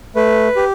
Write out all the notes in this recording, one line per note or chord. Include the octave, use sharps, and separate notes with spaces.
A3 B4
G4